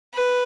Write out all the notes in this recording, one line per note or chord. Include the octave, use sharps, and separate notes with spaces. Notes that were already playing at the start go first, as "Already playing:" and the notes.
B4